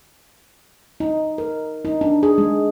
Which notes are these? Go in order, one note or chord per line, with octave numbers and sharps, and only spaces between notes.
D#4
A#4
D#4
D4
G#4
G#3